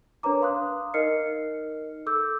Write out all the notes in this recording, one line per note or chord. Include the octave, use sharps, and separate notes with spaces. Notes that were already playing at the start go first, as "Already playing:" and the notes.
D4 A#4 B4 C#5 A#5 D6
F5 C6 D#6 F#6
D#4 A#4 D#5 F6 C7 C#7
A4 D6 E6 G6